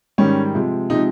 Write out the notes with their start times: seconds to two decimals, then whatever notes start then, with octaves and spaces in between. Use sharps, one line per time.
0.18 G#2 D#3 G3 C#4
0.55 C3 F3 G#3
0.90 C3 F3 G#3 D#4